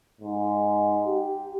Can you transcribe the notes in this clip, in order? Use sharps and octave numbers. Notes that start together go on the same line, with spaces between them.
G#2
G4